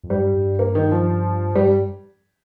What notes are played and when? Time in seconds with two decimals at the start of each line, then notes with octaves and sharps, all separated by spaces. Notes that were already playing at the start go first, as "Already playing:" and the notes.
0.04 F2
0.10 G2 G3
0.34 G2
0.59 A#3
0.75 D#3
0.91 F3
1.55 G2 G3